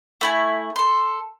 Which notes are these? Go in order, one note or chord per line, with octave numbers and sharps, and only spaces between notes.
A3 E4 G#5
A4 C6